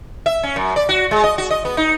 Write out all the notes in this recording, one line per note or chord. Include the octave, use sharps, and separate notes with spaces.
E5
C#4
F#2
D5
F#4
G#3
D#5
F#4
D#5
B3
D#4